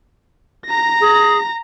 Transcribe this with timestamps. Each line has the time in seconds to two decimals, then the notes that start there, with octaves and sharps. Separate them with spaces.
0.66 A#5 A#6
1.00 G#4